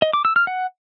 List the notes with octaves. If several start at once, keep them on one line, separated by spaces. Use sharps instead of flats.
D#5
D6
E6
F6
F#5